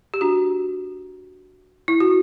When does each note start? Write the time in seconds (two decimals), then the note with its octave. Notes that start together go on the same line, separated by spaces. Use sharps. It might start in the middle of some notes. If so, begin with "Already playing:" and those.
0.14 G4
0.21 D4 F#4
1.88 E4
2.00 F#4